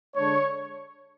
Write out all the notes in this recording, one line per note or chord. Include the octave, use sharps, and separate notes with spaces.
D3 G#3 D4 C#5